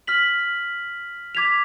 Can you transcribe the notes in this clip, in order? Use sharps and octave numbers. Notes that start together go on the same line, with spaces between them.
F6 B6 F#7
D6 G#6 B6 F7